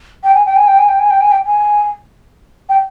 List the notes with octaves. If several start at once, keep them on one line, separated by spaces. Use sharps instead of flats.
G5
G#5
G5
G#5
G5
G#5
G5
G#5
G5
G#5
G5
G#5
G5